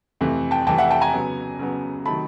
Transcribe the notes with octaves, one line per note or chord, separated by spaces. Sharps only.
F2 C3 E3 A3
G5 A5
F2 C3 E3 A3 G5 A5
E5 F#5
G5 A5
G#5 A#5
C#3 F#3 B3
C#3 F#3 B3
C3 D#3 F#3 A3 A5 B5